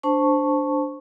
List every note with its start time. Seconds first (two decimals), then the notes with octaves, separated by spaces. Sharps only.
0.03 D4 C5 A5 C#6